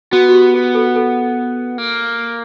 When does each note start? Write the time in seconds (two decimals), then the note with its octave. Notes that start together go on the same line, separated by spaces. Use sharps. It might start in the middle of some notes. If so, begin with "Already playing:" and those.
0.12 B3 F#4
0.29 F#4
0.33 G4
0.54 G#4
0.75 A4
0.96 A4
1.78 A#3